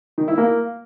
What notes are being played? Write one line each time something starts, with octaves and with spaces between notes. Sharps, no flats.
D#3
E4
A#3